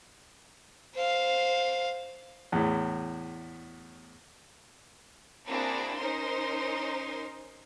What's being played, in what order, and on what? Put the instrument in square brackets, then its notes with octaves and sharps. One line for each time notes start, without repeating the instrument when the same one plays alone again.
[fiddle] C5 F5
[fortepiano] E2 A2
[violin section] A#3 C4 D4 E4 F#4 G#4
C#4 D#4 A#4 C5 C6